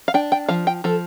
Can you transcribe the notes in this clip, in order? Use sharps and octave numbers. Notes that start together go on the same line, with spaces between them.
F5
D4 G5
G5
F3 F5
G5
F3 A4